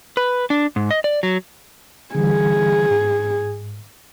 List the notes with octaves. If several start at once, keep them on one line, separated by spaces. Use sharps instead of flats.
B4
D4
G#2
D#5
D5
F#3
D3 E3 G3 G#4
G#2